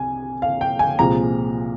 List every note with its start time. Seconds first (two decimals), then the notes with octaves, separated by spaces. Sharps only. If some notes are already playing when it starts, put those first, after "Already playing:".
Already playing: C2 G#5
0.42 F5
0.61 G5
0.79 G#5
0.99 C2 A#2 F3 G#3 A#5